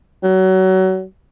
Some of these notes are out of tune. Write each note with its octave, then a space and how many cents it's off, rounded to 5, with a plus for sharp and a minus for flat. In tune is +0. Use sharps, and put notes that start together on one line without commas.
F#3 +25